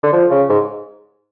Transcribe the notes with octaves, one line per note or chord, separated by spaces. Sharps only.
D3
F3
C#3
G#2